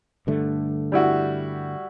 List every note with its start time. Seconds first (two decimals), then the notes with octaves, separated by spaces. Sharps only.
0.27 G2 D3 A3
0.92 G3 E4 F#4